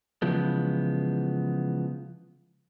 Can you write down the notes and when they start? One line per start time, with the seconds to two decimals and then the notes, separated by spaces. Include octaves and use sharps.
0.22 C#3 E3 F3 G#3 B3